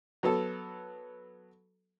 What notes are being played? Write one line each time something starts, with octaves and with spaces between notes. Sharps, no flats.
F#3 B3 A4